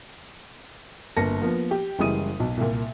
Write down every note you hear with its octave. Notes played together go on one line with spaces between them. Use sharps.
G1 A#3 A5 A#6 C#7
F3 A#3 B3
G4
F#1 E3 G3 G#3 D#6 D#7
B1
C2 A#2